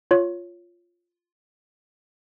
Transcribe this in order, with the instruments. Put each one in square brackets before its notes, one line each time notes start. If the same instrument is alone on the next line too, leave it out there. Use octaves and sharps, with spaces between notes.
[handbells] F4 C#5